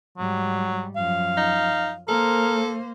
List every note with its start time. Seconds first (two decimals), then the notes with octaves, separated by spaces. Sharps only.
0.18 G#2 F#3 G3
0.96 F#2 F3 F5
1.37 D#4
2.08 A#3 A4 A#4 C5